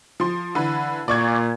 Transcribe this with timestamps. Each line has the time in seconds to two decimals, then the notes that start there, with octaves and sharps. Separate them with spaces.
0.20 F3 C6
0.55 D3 E3 B4
1.08 A#2 D5 C#6 G#6